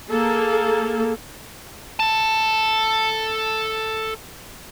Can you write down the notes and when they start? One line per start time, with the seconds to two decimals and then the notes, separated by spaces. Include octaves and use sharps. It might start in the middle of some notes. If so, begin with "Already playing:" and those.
0.11 A#3 G#4 A4
2.00 A4 A5